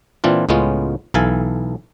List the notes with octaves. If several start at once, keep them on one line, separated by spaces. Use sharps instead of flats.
A#2 E3 C4 D4 F4
C#2 A2 G#3 B3 C#4 F4
B1 E3 A4 F5 G#5 A5